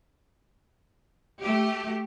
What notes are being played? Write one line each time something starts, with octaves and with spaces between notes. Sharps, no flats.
A3 G4